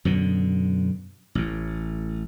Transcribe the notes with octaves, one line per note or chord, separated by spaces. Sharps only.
F#2 B2 D3
A1 A2